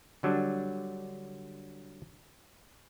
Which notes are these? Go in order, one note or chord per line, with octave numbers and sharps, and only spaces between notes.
D3 F#3 G3 D4